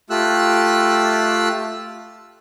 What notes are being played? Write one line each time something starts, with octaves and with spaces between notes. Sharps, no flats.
A3 F4 G4 E6 F#6